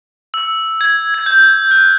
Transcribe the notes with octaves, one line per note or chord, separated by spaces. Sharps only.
E6
G#6
G#6
G6
F#6